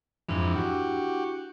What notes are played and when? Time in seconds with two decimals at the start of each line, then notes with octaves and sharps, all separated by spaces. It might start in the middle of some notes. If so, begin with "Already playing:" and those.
0.29 F2 G#2 E3 D4 E4
0.55 F#4 G4